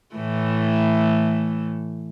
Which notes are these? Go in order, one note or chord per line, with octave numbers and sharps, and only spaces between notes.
A2 E3 A3